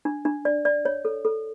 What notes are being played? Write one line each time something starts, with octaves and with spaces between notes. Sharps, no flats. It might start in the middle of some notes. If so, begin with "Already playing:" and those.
D4
D4
D5
D5
C#5
A4
A4